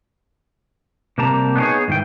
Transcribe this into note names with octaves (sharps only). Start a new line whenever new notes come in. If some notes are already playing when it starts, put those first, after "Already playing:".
C3 G3 A#3 G4 A5 A#5
B3 C#4 D#4 G4 G#4 C#5
G#2 D#3 E3 G5